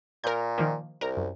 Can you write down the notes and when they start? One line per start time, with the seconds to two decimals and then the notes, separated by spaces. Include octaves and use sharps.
0.24 A#2 A#4 G6
0.58 D#3 F3 A#3
1.01 C2 A#4
1.17 F#2